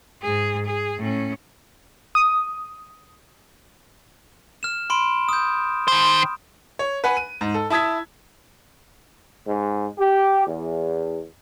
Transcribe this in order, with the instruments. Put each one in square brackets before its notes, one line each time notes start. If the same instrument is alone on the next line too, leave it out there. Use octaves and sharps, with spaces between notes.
[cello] G#2 G#4
G#4
A2 C#4
[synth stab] D#6
[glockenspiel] F6 E7
B5 C6 D7
D#6 G6
[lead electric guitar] D#3 C5
[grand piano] C#5
B4 F#5 G#5 B5
D#7
G#2
A4
E4 A5 D#6 G#6 B6
[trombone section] G#2
G4
E2